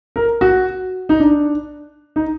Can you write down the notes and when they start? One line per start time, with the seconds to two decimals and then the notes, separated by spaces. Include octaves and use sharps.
0.16 A#4
0.41 F#4
1.09 D#4
1.20 D4
2.16 D#4